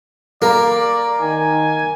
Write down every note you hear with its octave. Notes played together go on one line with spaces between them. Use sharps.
A#3 A#4 D5 A#5
D#3 G#5